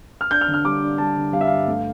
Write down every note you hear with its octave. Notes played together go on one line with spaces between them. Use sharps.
F6
D4 G6
F6
D3
F6
G3 D6
D4
G3 A5
D3
G3 F5
E5
G2 F5
A3